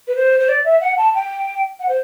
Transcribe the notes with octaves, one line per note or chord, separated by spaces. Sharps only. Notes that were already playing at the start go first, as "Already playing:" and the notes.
B4
C5
C5
D5
E5
F#5
A5
G5
F#5
C5